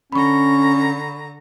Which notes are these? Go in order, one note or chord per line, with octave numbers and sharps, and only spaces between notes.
D3 C#4 A#5 B5 C#6